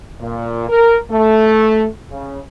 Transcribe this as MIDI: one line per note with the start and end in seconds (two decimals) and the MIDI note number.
0.21 0.67 46
0.69 0.98 70
1.11 1.87 57
2.11 2.39 49